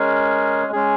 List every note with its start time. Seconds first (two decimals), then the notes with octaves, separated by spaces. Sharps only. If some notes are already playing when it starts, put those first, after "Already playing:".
Already playing: G#3 C#4 G#4 A#4
0.73 G#3 C#4 G#4